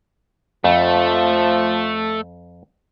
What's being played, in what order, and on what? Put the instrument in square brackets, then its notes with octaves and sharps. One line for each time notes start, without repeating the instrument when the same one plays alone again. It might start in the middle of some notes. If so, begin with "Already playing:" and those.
[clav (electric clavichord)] F2 [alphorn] F3 [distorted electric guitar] A3